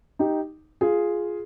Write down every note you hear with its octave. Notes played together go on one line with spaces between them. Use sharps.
D#4 G4
F4 G#4